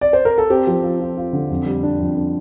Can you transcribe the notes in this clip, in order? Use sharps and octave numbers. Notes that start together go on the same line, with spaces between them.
D5
C5
A#4
A4
C4 G4
F3
F4
F4
F4
D3
F2
G3
D4
F2
D4